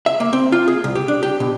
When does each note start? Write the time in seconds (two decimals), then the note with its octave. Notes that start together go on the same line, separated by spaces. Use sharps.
0.06 E5
0.20 A#3
0.33 C4
0.52 F4
0.68 G#4
0.84 C2
0.95 G4
1.08 D4
1.23 G4
1.40 B2